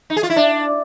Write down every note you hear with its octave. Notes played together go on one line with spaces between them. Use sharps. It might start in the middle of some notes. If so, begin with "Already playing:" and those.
D#4
G#4
F4
E4
D4